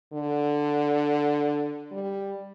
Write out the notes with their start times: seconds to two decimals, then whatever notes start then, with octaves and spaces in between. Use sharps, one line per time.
0.13 D3
1.91 G3